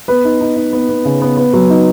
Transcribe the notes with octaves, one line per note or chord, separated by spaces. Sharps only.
B3 B4
D#4
D#4
D#4
B3
B3
C#3
B3
B3
F#3
D#4